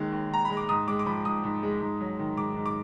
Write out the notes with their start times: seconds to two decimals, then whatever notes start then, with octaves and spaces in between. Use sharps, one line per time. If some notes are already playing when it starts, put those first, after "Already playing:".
Already playing: D#2 D#3 G#3
0.12 D#2
0.31 D#2 A#5
0.45 G#3 B5
0.57 D6
0.69 G#2 D#6
0.88 G#3 D6
0.99 D6
1.06 F3 B5
1.25 G#2 D#6
1.44 G#2
1.63 G#3
1.81 G#2
2.01 F#3
2.19 D#3
2.37 G#2 D6
2.56 G#2
2.66 D6